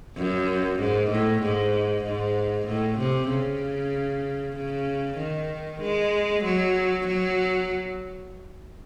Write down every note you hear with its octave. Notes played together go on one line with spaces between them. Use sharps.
F#2
G#2
A2
G#2
G#2
A2
C3
C#3
C#3
D#3
G#3
F#3
F#3